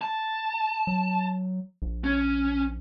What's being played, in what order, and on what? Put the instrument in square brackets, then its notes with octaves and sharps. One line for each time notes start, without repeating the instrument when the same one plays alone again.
[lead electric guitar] A5
[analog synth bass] F#3
A#1
[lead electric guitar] C#4